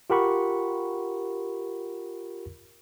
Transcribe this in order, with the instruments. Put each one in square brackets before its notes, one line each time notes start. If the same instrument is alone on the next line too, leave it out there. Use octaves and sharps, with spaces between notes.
[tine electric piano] F4 G4 A#4 F#5 B5 C#6